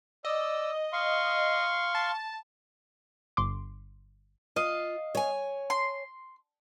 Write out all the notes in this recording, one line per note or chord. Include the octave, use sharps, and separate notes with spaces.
D5 D#5 E6
F5 C6 C#6
A5
G1 C6 D6
F4 D#5 F5
C#5 G#5
C6